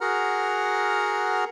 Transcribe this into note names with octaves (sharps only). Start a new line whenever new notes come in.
F#4 G#4 A#4 F#5 A#5 F6